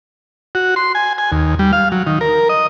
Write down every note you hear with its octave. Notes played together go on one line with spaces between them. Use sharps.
F#4
C6
G#5
G#5
D#2
G3
F5
F#3
D#3
A#4
D#5